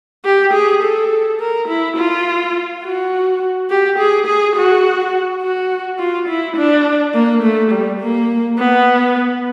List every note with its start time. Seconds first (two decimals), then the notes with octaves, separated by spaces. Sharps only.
0.25 G4
0.54 G#4
0.83 A4
1.40 A#4
1.68 E4
1.97 F4
2.84 F#4
3.70 G4
3.99 G#4
4.27 G#4
4.56 F#4
5.42 F#4
5.99 F4
6.28 E4
6.57 D4
7.14 A#3
7.43 A3
7.71 G3
8.00 A#3
8.58 B3